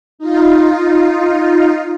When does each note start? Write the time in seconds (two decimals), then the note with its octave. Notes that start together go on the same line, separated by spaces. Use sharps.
0.19 D#4 F4